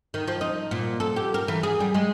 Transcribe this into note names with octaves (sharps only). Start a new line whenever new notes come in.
D#3
F3
D#4
A#2
A4
G4
A#4
E3
G#4
G3
G#3